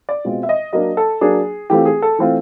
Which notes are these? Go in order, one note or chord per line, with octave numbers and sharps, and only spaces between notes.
D5
B2 G#3 C4 F4
E5
D#5
F#3 A#3 D4 D#5
A4
F#3 A#3 D4 G#4
E3 A3 C4 F4 G4
G#4
A4
E3 A3 C4 F4